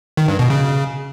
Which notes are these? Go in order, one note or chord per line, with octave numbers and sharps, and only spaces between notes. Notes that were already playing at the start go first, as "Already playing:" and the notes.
D#3
G2
B2
C#3